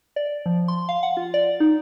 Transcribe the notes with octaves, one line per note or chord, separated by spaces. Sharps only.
D5
F3
C6
F5
F#5
F4
D5
D#4